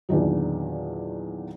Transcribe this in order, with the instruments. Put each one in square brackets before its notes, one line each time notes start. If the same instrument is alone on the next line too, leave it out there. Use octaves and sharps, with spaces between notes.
[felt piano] E2 A#2 D3 D#3 F#3